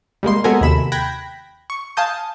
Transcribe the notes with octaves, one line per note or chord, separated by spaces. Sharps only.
G3 G#3 A#3 C6
G#3 B3 F#4 A4 A#4 G#5
D#2 C3 B5 E7
G5 B5 F#6 G#6 A#6
C#6
F5 G#5 A5 D#6 G6